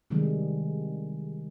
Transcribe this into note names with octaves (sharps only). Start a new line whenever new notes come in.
C3 D#3 G3 G#3